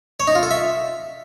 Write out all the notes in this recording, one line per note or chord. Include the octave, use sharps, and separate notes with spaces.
C#5
D#4
F4
A4
E5